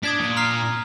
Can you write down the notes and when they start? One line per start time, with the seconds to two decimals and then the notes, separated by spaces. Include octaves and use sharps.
0.03 D4 D#6 G#6 B6
0.19 A#2
0.37 A#5 F6 C7